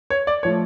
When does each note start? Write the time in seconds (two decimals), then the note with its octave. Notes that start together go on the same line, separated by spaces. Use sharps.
0.10 C#5
0.27 D5
0.43 F3 A3 C#5